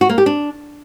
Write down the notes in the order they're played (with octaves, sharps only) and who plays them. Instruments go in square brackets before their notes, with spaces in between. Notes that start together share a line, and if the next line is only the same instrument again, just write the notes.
[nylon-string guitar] F#4
A#3
G4
D4